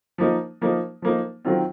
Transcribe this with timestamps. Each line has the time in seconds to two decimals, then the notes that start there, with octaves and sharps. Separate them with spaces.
0.18 F3 A#3 D#4
0.61 F3 A#3 D#4
1.02 F3 A#3 D#4
1.45 D#3 F#3 C4 F4